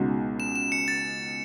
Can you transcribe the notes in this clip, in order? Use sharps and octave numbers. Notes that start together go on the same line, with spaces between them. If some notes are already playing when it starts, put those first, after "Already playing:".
Already playing: C#2 B2 G#3 D#4 F#4
E7
E7
C#7
A6